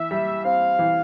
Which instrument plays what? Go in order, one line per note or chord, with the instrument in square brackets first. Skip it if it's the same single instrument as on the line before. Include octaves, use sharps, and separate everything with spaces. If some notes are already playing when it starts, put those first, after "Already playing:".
Already playing: [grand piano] E3 [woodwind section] E5
[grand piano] G3
[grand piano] C4 [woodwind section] F5
[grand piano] E3